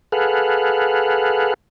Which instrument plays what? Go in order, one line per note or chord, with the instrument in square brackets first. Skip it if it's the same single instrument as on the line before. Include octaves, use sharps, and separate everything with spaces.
[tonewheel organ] G#4 A4 B4 F5 F#5